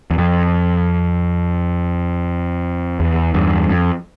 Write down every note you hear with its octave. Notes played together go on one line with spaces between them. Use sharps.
E2
F2
E2
E2 G2
F2